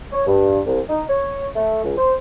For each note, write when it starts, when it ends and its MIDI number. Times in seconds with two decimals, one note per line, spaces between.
0.12 0.23 73
0.26 0.59 43
0.66 0.81 36
0.89 1.03 63
1.08 1.47 73
1.55 1.82 57
1.84 1.93 37
1.97 2.14 72